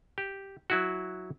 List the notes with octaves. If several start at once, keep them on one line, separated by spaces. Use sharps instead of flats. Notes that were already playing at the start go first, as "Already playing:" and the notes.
G4
F#3 E4 F#4